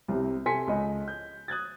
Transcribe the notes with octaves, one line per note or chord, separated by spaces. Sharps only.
C2 C3
C3 A4 G#5 C6 B6 C#7
C#2 D#5
G6
D#6 F#6 G#6 A6